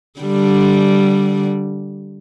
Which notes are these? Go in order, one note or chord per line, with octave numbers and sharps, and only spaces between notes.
D3 G3